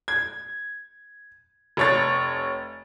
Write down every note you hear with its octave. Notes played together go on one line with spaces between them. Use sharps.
G#6
F1 C#5 A6